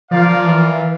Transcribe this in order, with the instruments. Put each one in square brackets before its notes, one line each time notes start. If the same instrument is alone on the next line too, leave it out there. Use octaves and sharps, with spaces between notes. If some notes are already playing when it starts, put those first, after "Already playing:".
[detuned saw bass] F3 [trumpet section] F4 A#4 D5 F5
[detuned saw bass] F3
E3